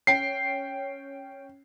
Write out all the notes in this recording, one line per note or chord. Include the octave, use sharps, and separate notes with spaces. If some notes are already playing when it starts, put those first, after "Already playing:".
C#4 G5 C7